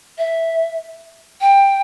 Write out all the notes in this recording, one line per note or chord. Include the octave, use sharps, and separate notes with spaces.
E5
G5